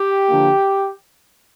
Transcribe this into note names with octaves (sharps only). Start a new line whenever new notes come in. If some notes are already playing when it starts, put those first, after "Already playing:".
Already playing: G4
D3 F3 A#3 D4